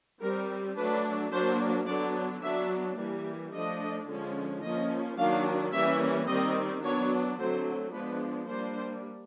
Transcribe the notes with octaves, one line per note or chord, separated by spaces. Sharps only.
G3 C4 A#4
F#3 A3 D4 B4
F#3 A#3 D4 C5
D3 F#3 B3 D4 D5
F#3 B3 D4 E5
E3 G3 A#3
F3 A3 D4 D#5
D3 F3 G#3 C#4
F3 A#3 C#4 D#5
D#3 F#3 A#3 D4 F5
E3 G3 A#3 C#4 E5
D#3 G3 C4 D#5
F#3 B3 D4 C#5
D3 F#3 A3 C4 C5
F3 G#3 B3 D4 B4
G3 A#3 D4 C5